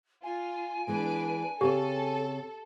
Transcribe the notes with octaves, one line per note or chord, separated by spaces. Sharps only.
F4 G#5
E3 G#3 B3 D4 B4 D7
C#3 C4 G4 A4 C#5